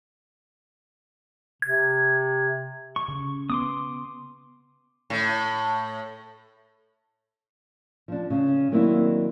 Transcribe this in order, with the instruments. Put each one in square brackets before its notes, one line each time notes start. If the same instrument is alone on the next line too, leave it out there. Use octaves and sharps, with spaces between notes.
[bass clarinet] C3 [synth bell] G#6
[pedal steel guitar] C#6
[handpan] C#3
[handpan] B3 [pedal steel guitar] C6 D6 D#6
[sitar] A2
[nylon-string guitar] F3 D4
C#3
D#3 F#3 A#3 C4 D4 E4